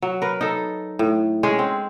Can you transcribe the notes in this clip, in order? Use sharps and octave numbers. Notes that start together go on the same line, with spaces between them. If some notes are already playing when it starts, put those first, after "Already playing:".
F#3
A#4 B4
D#4 A4
A2
G#3 C#4 G#4
C4